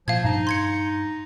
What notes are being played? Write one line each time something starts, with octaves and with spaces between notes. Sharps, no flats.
A#2 F3 F5 G#6
G2 D#4
C6 G#6 C#7